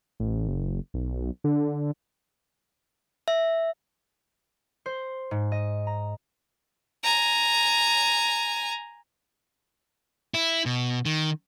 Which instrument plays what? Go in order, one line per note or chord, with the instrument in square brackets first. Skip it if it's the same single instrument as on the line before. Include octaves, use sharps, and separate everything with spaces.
[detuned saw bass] A1
F#1
B1
D3
[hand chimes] E5
[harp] C5
G#2
D#5
A#5
[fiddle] G#5 A#5
[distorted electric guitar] E4
B2
D#3